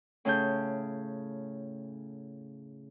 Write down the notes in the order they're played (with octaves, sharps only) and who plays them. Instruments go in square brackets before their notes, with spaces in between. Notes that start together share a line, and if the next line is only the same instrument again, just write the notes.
[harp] A2 C#3 A4 G6